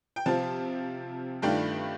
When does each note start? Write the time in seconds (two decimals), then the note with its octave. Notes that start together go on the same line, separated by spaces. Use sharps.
0.16 G5
0.26 C3 F3 C4 F4 A5
1.42 G2 D#3 A3 D4 F4 G5